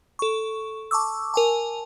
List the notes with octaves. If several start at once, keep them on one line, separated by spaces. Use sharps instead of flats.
A4 C#6
A5 C#6 D6 E6
A#4 G#5 A5